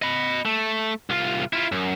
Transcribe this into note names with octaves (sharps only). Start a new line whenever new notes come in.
D#5 B5
A3
C2 F4
E4 F4
F#2